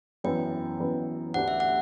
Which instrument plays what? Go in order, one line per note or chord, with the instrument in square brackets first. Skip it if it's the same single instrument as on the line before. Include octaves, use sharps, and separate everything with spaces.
[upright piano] F#2 E3 B3 [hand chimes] G5
[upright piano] F#2 E3 B3
[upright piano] D2 D3 A3 D4 G4 [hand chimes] F#5
[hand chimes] E5
F#5